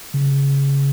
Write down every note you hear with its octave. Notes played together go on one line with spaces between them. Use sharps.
C#3